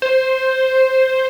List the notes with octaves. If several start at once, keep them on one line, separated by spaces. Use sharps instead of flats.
C5